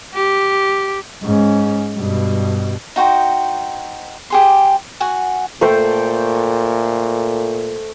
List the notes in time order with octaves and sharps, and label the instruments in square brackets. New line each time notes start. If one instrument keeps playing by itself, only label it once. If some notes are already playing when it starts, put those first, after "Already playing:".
[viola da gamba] G4
[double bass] G#2 C#4
G2 B2
[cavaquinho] D#4 F#4 C5 G5
G4 G#4 C6
F#4 F#5 G#5
[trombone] A#2 [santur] A3 C5 G5